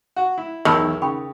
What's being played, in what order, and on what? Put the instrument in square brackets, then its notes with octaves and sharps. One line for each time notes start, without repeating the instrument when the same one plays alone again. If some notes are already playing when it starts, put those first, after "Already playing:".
[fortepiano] F#4
E4
[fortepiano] B1 E2 [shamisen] D#3 [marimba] A5 B5 E6
[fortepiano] C#3 [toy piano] G5 B5 C#6 [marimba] D#6